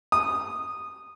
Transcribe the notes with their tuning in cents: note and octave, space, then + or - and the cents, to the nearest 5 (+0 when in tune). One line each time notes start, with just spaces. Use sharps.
D#6 -10